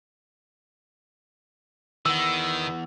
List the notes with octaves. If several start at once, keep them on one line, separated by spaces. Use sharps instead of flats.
D#3 E3 B3 E6